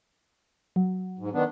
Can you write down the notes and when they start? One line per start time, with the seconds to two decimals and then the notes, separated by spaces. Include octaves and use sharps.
0.76 F#3
1.19 G#2
1.33 D#3 B3 D4